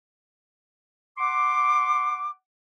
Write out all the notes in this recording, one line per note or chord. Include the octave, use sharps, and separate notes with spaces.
F#5 C6 D6